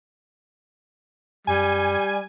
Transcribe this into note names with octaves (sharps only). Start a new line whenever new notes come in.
F#2 G3 G#5